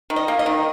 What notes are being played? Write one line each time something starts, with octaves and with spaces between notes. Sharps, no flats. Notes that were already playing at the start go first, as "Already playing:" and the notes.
D#3
D#5
A#3
D#5
D#3